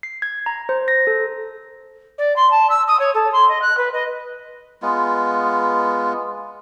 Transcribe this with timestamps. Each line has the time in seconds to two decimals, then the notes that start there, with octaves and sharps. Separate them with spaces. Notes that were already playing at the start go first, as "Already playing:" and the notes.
0.03 C7
0.22 G#6
0.46 A#5
0.69 C5
0.88 A#6
1.07 A4
2.18 D5
2.36 C6
2.51 A5
2.70 E6
2.88 D#6
2.99 C#5
3.14 A4
3.33 C6
3.49 D#5
3.62 F#6
3.77 B4
3.93 D#5
4.82 G#3 B3 F4